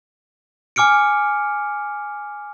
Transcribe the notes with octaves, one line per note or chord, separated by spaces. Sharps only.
G#5 D6 F6 C#7 D7